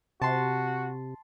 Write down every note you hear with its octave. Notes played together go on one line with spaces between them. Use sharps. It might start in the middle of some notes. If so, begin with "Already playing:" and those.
C3 F#4 A5 C6